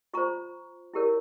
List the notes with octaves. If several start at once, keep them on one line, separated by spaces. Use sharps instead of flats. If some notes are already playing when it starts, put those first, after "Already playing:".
F4 C5 A#5 C#6
E4 G4 A#4 C#5